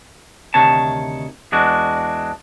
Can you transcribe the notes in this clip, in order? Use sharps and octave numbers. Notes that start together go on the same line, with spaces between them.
D2 C3 D#3 C#5 A5
E2 G#3 D4 F#4